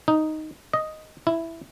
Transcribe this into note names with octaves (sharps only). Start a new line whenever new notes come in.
D#4
D#5
E4